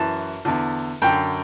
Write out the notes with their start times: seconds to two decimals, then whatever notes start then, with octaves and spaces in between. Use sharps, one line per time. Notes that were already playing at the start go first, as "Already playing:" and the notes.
Already playing: F#2 E3 A5
0.45 E2 D3
1.02 F#2 D3 G5